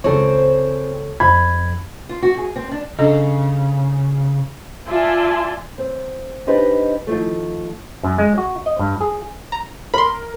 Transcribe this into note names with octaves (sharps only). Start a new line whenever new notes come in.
C#2 C4 G#4 A4 C5 C#5
F2 B5 G#6
F4
F#4
G#4
C4
D4
C#3 D4 A4 D#5
F4 D5 E5 G#5 A5 C6
C4
D4 D#4 G4 B4 C5 D#5
D#3 F3 A3
F#2
G#3
F#4
D#5
G2
G#4
A#5
A#4 B5 C6